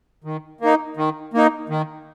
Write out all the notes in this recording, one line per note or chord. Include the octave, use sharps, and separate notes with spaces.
D#3
A#3 D#4
D#3
A#3 D#4
D#3